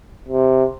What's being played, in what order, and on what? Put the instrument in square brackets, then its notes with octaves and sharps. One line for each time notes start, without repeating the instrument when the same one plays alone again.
[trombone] C3